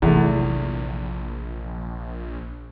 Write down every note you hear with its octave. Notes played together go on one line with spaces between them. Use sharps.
A#1 E2 C3 F#3 A3